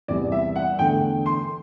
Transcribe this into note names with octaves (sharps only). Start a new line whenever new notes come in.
E2 C3 G3 B3 D5
E5
F#5
E2 D3 A3 G5
C6